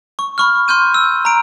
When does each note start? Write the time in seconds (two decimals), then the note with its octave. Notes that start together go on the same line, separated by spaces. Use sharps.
0.19 C#6
0.38 B5 C#6 F6
0.68 C6 F6 G6 D#7
0.94 E6
1.25 A#5 D7